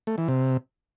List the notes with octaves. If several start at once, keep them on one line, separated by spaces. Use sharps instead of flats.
A3
E3
C3